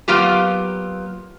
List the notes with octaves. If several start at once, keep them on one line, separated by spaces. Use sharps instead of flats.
F#3 A#3 B3 F4 G4